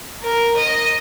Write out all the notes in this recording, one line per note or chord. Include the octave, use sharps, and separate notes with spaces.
A#4
D#5